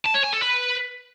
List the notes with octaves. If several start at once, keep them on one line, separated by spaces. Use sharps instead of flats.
A5
C#5
G#5
A4
B4